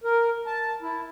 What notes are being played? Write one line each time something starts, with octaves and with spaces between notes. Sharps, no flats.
A#4
A5
E4